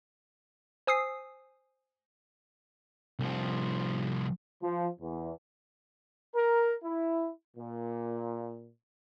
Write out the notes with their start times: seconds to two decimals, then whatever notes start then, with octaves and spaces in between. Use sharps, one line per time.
0.87 C5 G#5 D#6 E6 C7
3.19 C2 F3
4.62 F3
5.00 E2
6.35 A#4
6.84 E4
7.57 A#2